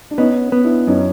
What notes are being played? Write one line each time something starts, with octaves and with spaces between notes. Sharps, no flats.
D4
B3 C#4 D#4
B3
D4 E4
F#2 C#4 D#4